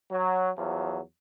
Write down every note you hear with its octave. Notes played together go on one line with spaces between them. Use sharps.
F#3
E2 F3 F#3